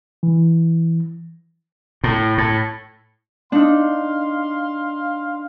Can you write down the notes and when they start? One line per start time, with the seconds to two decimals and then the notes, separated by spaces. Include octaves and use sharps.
0.23 E3
2.04 A2
2.38 A2
3.52 D4 D#4 F5 C6